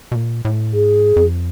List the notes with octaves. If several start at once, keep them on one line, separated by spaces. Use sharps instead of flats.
B2
A#2
A2
G#2 G#4
F2